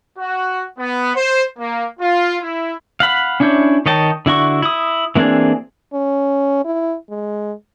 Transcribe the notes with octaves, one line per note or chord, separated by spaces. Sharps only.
F#4
B3
C5
A#3
F4
E4
F5 F#5 B5
C#4 D4 E4 C#5 G6
D#3 C#5 D#5 G5 A5
D3 E4 F#4 C#6
E4 D#6
E3 A#3 C4 D4 G#4
C#4
E4
G#3